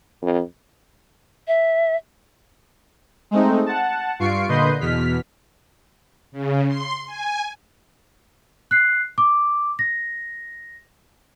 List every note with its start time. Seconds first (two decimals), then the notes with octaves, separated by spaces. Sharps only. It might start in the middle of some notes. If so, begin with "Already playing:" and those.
0.22 F2
1.47 E5
3.31 G#3 A3 C4 D#4
3.66 F#5 A5
4.19 G2 F4 C#6 C7 D7
4.48 A#2 D3 B4 D#5 C6 G6
4.80 E2 B2 F6 B6
6.32 C#3
6.67 C6
7.07 G#5
8.71 F#6 C7
9.18 D6
9.79 A#6